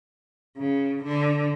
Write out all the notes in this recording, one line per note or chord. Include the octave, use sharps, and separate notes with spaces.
C#3
D3